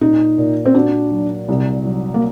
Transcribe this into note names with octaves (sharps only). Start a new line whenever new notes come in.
A#2 D#4
A#2
C4
D4 F#4
F#3
C2
F#3
A#3